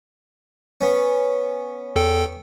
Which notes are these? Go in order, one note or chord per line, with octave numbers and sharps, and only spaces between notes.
B3 C#4
E2 A4 G5